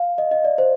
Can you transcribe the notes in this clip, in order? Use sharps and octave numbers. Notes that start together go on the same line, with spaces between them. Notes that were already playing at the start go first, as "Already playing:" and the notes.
Already playing: F5
D#5
D#5
D5
C5